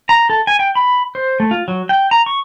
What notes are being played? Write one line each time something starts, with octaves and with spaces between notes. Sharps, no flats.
A#5
A4
G#5
G5
B5
C5
A3
F4
F#3
G5
A#5
C#6